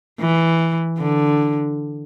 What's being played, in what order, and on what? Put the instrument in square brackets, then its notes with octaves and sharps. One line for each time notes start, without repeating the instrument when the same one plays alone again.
[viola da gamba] E3
D3